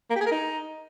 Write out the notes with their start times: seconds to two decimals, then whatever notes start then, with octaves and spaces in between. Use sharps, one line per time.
0.10 A#3
0.15 G4
0.21 G#4
0.26 A#4
0.31 D#4